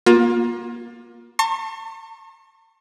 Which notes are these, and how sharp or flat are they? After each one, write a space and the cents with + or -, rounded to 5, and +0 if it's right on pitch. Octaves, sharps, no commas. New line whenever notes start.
A#3 +30 F4 +25
A5 +40 C#6 -45